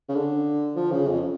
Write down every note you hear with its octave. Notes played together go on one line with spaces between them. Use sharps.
C#3
D3
F3
C#3
F2